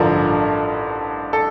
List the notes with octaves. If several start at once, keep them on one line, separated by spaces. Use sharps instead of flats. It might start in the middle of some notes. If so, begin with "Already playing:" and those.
Already playing: A1 G2 D3 F3 A#4
A4